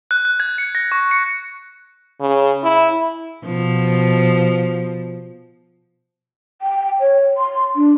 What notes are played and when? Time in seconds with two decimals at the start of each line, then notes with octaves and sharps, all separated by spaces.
0.11 F#6
0.25 F#6
0.40 G#6
0.58 C#7
0.75 A#6
0.92 C#6
1.11 C#7
2.20 C#3
2.64 E4
3.45 B2 F3
6.62 G5
7.00 C#5
7.37 C6
7.76 D4